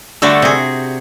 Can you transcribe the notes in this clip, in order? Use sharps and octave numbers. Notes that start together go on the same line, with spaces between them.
D3 G3 A3 F#4 A4
C3 G#4